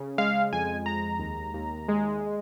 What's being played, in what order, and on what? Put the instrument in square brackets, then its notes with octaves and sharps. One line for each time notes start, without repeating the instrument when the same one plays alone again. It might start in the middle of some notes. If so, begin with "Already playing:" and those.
Already playing: [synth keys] C#3
G#3 F5
F2 G#5
G#3 A#5
D#2
D#2
G#3